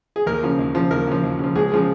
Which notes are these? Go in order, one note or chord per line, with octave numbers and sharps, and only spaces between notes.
G#4
D#2 A#4
C#3 F3
D#2
C#3 F3
D#2 A#4
C#3 F3
D#2
C#3 F3
C#2 G#4
C#3 F3 G#3